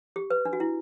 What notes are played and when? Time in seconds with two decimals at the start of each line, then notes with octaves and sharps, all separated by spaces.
0.16 G4
0.30 B4
0.45 D4
0.53 F#4
0.60 E4